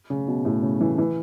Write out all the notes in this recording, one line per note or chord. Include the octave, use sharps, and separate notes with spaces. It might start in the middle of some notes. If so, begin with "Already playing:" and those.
C#3
B2
A2
C#3
E3
E3